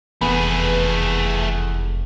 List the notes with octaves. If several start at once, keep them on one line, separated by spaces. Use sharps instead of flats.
F1 E2 A3 G#4 B4